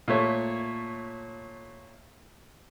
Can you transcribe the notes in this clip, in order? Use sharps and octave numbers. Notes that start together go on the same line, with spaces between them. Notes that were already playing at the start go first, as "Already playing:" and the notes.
A#2 A3 C#5